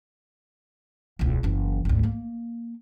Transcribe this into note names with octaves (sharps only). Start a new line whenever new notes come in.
E1 C#2
F#1 E3
G#1 D2
A#3